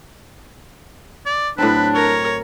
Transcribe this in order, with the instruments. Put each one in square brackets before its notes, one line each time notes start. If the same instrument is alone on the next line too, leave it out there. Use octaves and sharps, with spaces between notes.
[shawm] D5
[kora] A2 F#3 C4 [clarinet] D4 [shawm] B4
[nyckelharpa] A#4 [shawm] C#5